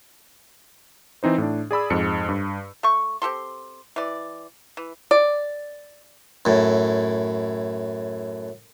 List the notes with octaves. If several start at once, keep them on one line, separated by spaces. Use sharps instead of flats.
E3 C4 D#4 C5
A2 D4
G#4 D5 B5 E6
F2 G#2 G#3 C#7
G2
A3 C#6
C4 G4 A4 C6
E3 D5
E3
D5
F#2 A2